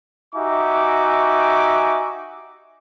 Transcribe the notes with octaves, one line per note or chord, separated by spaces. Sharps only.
D#4 F#4 G4 E5 G#5 D6